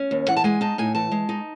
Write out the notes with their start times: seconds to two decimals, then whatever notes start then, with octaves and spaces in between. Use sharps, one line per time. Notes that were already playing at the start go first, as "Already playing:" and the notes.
Already playing: C#4
0.11 D#2
0.28 E3 F#5
0.37 A5
0.44 G#3 G#5
0.61 D#4 A5
0.78 A2 G#5
0.95 E3 A5
1.12 G#3
1.29 D#4